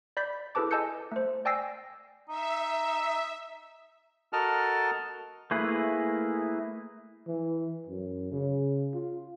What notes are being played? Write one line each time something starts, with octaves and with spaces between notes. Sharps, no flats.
D5 B5 G6 B6
E4 G#4 A4 B4 A5 D6
D#5 G#5 A5 E6 G6 C#7
A3 C5
D5 G5 G#5 E6 A#6 C7
D#4 E5
F#4 A4 A#4 D#5 A5 F6
A3 A#3 E4 G#4 B4
E3
F#2
C#3
F4